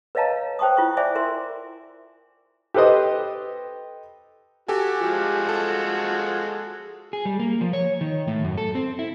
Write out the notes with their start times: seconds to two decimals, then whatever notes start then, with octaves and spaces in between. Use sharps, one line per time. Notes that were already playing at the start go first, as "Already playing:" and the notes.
0.15 B4 C#5 D#5 F5 A5 A#5
0.59 C5 G5 A5 C#6 D#6
0.77 E4 F4 C#6
0.97 C5 D5 E5 G#5 D6
1.15 A#4 E5 C6
2.74 G4 A4 B4 C5 D#5
4.68 F#4 G4 A4 G#5
5.01 F3 G#3 F#4
5.49 A4
7.13 G#4
7.25 G3
7.40 A#3
7.61 F3
7.73 C#5
8.01 D#3
8.28 A2
8.44 F#2
8.58 A4
8.75 C4
8.99 E4